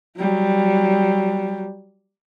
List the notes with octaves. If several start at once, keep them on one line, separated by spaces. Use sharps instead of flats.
F#3 G3